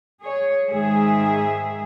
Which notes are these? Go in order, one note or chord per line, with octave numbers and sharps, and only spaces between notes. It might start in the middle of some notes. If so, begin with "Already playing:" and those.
G#4 C#5
G#2 D#3 G#4 E5